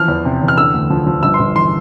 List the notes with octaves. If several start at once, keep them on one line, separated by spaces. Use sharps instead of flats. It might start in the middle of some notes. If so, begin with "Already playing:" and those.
Already playing: E3 F3 F6
E2
C3
E2
F6
D3 E6
D2
F3
F3
G1 E6
C6
G1
E3 C6